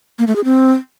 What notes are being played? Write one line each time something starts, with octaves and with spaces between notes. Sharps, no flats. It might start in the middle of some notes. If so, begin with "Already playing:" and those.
A#3
A3
G#4
C4